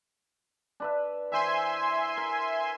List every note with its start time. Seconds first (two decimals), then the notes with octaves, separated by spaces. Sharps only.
0.80 D4 B4 E5
1.32 E3 C5 E5 G#5 C6
2.17 A#4